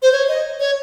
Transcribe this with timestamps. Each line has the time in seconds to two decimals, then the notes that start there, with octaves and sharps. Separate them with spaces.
0.02 C5
0.12 C#5
0.28 D#5
0.60 C#5